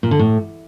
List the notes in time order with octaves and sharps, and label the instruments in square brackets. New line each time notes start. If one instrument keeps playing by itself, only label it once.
[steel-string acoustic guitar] A#2
D3
A2